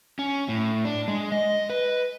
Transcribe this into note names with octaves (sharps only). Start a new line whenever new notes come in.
C#4
A2
D4
G#3
D#5
B4